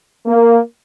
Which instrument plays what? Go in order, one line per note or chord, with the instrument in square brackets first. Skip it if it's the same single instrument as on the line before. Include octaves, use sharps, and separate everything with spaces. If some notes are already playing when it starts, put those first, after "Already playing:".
[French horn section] A#3